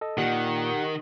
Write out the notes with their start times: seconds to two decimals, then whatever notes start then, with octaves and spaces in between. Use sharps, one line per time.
0.01 A4 D#5
0.18 A#2 D#3 G4 F#5 F#6 C#7